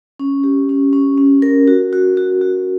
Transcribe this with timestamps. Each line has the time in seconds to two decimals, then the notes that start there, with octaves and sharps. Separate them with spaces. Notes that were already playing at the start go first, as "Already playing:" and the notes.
0.19 C#4
0.44 G4
0.69 C#4
0.93 C#4
1.18 C#4
1.42 A#4
1.68 F#4
1.93 F#4
2.17 F#4
2.41 F#4